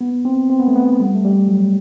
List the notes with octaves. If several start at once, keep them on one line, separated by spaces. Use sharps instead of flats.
B3
C4
C4
B3
A3
B3
G3
A3
G3
F#3